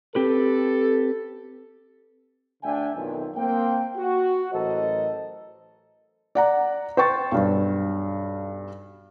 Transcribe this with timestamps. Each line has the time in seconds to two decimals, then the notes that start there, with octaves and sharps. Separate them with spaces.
0.15 C4 G4 A4 B4
2.63 D2 D3 D4 E5 G5 G#5
2.94 B1 F2 D#3
3.35 A#3 C4 G5
3.96 F#4
4.53 A1 F#3 A4 A#4 C5 D#5
6.35 D5 F#5 A#5
6.97 C5 G5 C#6 A6
7.32 B1 G2